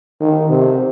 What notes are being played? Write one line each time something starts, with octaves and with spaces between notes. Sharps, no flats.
D#3
C3